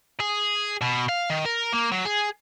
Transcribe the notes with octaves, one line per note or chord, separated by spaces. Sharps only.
G#4
B2
F5
D#3
A#4
A#3
F#3
G#4